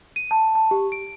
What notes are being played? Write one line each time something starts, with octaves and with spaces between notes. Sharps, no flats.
D#7
A5
A5
G4
D7